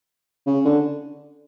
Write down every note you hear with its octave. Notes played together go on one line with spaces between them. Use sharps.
C#3
D3